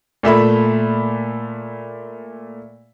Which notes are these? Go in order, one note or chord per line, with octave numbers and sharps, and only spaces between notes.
A#2 A3 E5 B5